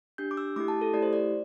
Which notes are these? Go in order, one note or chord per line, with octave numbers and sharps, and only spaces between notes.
D4 G4 G6
D6
E6
A3 E4 G4 D6
A5
A4
A3 E4 G4 D5
C5
D5